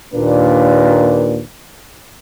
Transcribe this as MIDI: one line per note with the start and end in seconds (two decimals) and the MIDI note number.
0.14 1.41 39
0.14 1.41 46
0.14 1.41 58
0.14 1.41 62
0.14 1.41 71